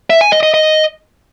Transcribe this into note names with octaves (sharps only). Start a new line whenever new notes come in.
E5
G#5
D#5
D#5
D#5